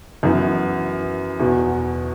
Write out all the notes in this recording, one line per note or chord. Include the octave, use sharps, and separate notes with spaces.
F#2 E3 B3 F#4
E2 B2 B3 F#4